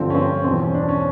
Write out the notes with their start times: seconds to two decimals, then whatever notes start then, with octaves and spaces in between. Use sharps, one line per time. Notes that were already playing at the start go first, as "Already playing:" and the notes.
Already playing: G2 D3 F3 C4
0.10 C#4
0.15 C4
0.44 E2 B2 C4
0.60 C#4
0.74 D4
0.89 C#4